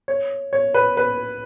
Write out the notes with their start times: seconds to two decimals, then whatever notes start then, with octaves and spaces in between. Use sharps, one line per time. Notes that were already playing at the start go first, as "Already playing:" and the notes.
0.08 C#5
0.53 C#5
0.74 B4
0.97 B4